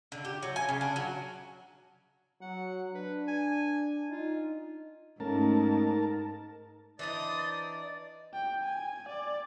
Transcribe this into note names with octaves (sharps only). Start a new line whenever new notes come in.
D3
G4
F#3
G#5
C#3
D4
F#3
F#3 F#5
D4 B4
G#5
D#4 F4
G#2 A3 C#4 A#4 A5
E3 D4 D#4 C5 D5 D#5 D#6 A6
G5
G#5
D5